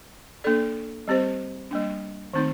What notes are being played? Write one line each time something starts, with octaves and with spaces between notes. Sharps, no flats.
A#3 D4 A4 D5
G3 C4 G4 C5
G3 A#3 D4
D#3 A3 C4 D#4